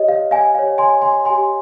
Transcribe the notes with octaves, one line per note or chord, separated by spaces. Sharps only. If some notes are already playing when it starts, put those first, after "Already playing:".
Already playing: G4 C#5 D#5
F5
F5 G#5
G4 C#5 F5
G#5 C6
G#5 C6
G4 C#5 G#5 C6